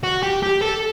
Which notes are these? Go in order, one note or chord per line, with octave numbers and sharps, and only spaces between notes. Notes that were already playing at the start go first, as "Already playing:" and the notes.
F#4
G4
G4
A4